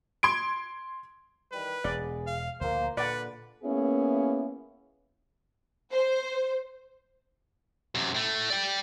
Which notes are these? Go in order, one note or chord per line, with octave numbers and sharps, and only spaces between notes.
C6 G#6 D7
D#3 E3 G3 B4
E1 B3 G#4 D5
F5
D2 A#2 F3 A#3 C5
A#2 D3 B4 D5 F#5
A#3 B3 C#4 E4 G#4
C5
F#2 C3
A2 A3
D5 G5